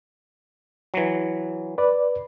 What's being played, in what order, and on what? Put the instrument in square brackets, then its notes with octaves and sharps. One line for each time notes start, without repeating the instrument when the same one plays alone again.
[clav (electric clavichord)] E3 F#3
[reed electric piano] B4 D5